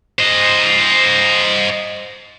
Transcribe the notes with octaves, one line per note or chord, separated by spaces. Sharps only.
C5 D#5